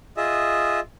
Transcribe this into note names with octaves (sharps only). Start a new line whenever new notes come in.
F4 G#4 D#5 E5